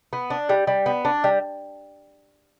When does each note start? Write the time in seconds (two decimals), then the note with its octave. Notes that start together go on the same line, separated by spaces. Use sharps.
0.13 B3
0.30 D4
0.49 G3
0.67 G3
0.86 B3
1.05 D4
1.24 G3